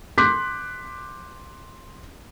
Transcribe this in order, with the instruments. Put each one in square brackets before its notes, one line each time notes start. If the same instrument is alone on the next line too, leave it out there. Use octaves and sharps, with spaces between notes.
[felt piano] C6 D6 F#6 G6 B6